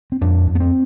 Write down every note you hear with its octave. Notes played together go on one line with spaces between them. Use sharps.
C4
F2 D4
F2
B3
C4